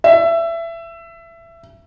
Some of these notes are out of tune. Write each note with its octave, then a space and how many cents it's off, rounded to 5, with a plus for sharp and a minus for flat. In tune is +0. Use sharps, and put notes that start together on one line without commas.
E5 +20